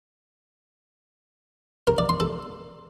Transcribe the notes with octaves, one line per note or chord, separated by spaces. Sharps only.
A#4
D5
C6
A4